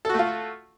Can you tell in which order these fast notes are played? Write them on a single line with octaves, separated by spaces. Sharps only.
A4 F#4 A3 F4